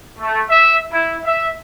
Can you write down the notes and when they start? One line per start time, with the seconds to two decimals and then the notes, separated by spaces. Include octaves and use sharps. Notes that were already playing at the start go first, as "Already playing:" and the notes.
0.19 A3
0.48 E5
0.92 E4
1.24 E5